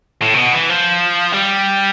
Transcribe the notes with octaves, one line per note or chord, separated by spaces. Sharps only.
A2
C3
B2
E3
F3
G3